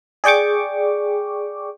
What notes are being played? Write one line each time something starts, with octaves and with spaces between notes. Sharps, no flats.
G#4 D5 G5 C#6 D6